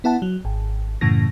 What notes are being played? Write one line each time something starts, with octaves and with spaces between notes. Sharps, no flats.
B3 E4 F#5 A5
F#3
G#1
F#2 A2 C#3 E3 A#6